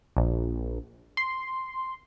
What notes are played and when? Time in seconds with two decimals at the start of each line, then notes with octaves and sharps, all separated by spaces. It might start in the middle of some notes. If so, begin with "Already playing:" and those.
0.17 A#1
1.17 C6